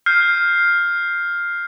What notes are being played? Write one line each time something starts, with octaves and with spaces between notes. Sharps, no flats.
F6 G6 C7